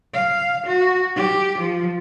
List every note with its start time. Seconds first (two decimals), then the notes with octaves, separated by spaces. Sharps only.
0.14 F5
0.67 F#4
1.16 G4
1.59 F3